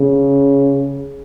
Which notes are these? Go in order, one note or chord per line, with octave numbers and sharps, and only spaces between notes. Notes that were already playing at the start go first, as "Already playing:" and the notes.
Already playing: C#3